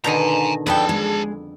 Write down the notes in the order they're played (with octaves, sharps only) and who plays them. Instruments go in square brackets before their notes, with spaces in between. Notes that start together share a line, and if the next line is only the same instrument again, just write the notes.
[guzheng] B2 D3 D#3 [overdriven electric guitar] G#5 A#5
[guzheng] F2 B3 A4 [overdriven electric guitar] G#4 A5 [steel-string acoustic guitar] D5 G5
[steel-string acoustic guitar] G#3